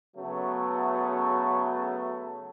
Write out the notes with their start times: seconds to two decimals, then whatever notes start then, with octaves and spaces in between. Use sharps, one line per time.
0.17 C#3 F#3 A3 B3